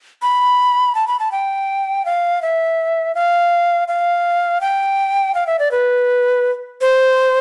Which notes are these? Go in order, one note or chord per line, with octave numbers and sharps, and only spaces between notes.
B5
A5
B5
A5
G5
F5
E5
F5
F5
G5
F5
E5
D5
B4
C5